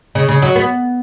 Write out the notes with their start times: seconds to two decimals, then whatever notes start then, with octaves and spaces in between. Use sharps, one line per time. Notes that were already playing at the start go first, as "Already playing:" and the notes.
0.15 C#3
0.29 C#3
0.42 F#3
0.56 B3